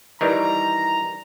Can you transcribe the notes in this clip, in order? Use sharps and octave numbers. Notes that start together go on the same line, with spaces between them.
D#3 E3 G3 A#5